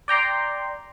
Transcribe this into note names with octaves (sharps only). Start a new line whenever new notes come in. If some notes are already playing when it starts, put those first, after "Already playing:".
D5 G5 A#5 C6